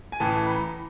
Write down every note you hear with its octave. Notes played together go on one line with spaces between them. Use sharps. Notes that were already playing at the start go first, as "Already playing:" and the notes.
G#5
A1 A2 E3 A5
B5
A#5